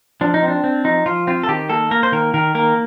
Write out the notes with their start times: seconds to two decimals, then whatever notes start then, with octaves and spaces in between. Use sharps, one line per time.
0.21 F3 D4
0.34 D#4
0.43 C4
0.48 D4
0.64 C4
0.84 F3 D#4
1.06 F3 F4
1.27 C4 F4
1.43 A4
1.49 D#3 G4
1.70 A#3 A4
1.91 A#3 A#4
2.03 C5
2.12 D#3 A#4
2.34 D#3 A#4
2.55 A#3 A#4